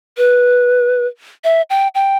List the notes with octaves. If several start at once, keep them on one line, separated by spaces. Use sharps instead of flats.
B4
E5
G5
G5